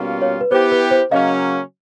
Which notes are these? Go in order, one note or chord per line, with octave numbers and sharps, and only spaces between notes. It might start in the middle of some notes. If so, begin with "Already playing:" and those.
Already playing: B2 G3 A#3 C#4 F4
C#5
B4
B3 E4 G4 C5
B4
C5
C#3 F#3 A#3 C#4 D#5 F5